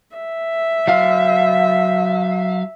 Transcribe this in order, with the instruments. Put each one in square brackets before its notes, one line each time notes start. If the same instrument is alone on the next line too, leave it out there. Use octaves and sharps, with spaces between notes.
[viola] E5
[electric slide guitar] F#3 F5